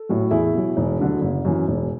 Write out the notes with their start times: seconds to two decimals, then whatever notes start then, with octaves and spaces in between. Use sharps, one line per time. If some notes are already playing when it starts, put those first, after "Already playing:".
Already playing: A4
0.09 A2 F#3
0.31 E2 E4 G#4
0.54 B2 F#3
0.77 E1
0.99 D2 D3 F#3
1.21 F#1
1.45 F#2 E3
1.68 E1